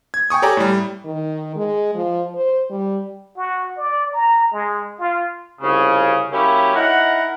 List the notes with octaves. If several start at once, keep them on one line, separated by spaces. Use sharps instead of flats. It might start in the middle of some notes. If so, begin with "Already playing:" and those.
G#6
G5 G#5 C#6 D#6
G4 A4 C#5 D5 G#5 A#5
A2 G3
D#3
G#3
F3
C5
G3
F#4
D5
A#5
G#3
F4
C2 F2 C#3
F#3 A#3 C#4 E4 G4
D#4 E4 A#4 F#5